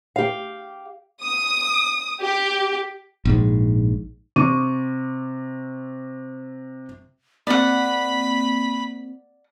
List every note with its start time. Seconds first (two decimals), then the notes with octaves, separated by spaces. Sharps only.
0.16 G4 F5
1.22 D#6
2.22 G4
3.25 A#1 G#2
4.36 C3 C4 C#6 D6 D#7
7.47 A#3 C4 D5 F#5 B5